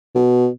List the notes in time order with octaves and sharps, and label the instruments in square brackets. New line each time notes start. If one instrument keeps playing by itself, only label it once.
[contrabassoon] B2